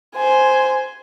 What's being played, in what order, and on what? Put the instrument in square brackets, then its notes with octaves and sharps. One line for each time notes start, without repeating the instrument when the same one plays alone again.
[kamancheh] C5 G#5